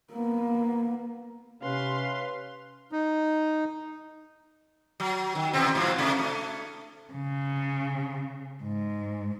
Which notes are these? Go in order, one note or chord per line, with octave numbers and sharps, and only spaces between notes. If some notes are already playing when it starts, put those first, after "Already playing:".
A#3 B3
C3 C#4 B4 F5 C6
D#4
F#3
D#3
E2 C3 C4
G#2 F3 F#3
C3 A3 D4
A3
C#3
G#2